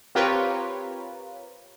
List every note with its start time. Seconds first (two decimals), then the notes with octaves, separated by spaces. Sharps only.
0.15 C4 F4 G4 A#4 B4 C#5